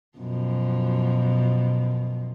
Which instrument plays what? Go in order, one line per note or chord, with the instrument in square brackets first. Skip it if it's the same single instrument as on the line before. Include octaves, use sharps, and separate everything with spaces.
[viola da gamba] F#2 B2 F3